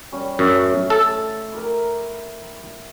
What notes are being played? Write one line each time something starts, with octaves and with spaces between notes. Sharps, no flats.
G3 C#4 C#6
F#2 A2 C#4
A4
E4 G4 A#4